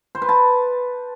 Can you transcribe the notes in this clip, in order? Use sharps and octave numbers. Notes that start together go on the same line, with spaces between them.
C5
B4
A5